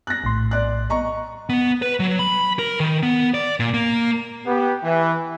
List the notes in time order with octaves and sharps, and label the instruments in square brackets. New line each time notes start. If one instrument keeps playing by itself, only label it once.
[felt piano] F#6 A#6
[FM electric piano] A#1 A2 C6
[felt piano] D5 F#6
D#5 A#5 C#6
[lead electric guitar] B3
B4
F#3
B5
A#4
D#3
B3
D5
A#2
A#3
[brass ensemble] B3 G4
E3